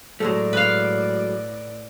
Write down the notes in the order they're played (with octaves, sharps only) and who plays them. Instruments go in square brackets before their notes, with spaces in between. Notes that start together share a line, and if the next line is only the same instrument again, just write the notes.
[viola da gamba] A2 D5 [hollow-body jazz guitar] F#3 G#3 A3
[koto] B4 F5